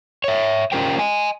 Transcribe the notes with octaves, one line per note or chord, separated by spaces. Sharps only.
C#5 E5
C#4 F4 G4 A#4 C5 G5
D#5 G#5